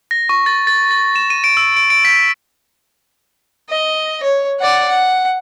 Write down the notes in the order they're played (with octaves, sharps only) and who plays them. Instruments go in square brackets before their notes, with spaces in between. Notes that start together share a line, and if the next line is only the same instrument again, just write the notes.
[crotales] A#6
C#6
A6
A6
A6
E7
D#7
D7
E6
D7
D7
B6
[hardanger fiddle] D#5
C#5
D5 F#5
F#5